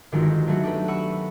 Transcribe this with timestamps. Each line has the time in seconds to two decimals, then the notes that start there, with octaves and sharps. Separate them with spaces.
0.12 G1 D#3 G#3 F4 F#4 G6
0.47 F#3 A3 B3 F#4
0.63 D4 G4 B4
0.88 B4 F#5 B5 C#6 E6